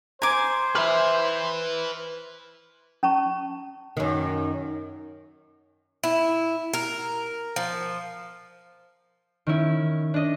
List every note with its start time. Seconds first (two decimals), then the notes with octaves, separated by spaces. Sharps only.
0.22 C5 G#5 A#5 D6 G#6
0.75 B4 E5 B5 C6 F6
3.03 C#4 A5 A#5 C#6
3.97 F#2 D#3
6.03 E4
6.73 A#4
7.56 F3
9.47 D#3 C#4 E4
10.14 D4 D#5